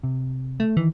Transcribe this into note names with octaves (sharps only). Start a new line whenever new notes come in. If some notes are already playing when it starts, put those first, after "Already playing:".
C3
A3
D#3 E3